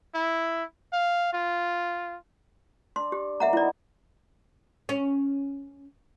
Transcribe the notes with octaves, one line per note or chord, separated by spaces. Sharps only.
E4
F5
F4
D4 C6
G4
B2 F#3 A#3 E5 F#5 A#5
B3 D#4 E4 D5
C#4